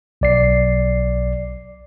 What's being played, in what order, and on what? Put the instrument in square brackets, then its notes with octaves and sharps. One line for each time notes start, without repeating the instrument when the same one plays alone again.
[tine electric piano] B1 D5 C7